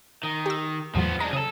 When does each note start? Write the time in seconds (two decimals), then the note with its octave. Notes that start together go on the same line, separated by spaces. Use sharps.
0.23 D#3
0.46 G4 E6
0.95 E2 A2 F3 F#3 B3
1.20 G#3 D4 A#5
1.33 C#3 G#4 A4